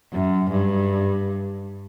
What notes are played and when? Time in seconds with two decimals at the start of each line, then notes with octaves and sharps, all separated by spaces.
0.13 F#2
0.51 G2